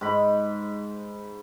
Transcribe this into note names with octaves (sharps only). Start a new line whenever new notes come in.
G#2 B5